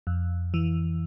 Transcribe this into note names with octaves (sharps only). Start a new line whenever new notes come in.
F2
E3